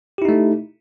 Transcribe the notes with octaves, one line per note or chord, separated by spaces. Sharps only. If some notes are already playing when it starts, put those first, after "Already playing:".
A3 D#4 E4 G4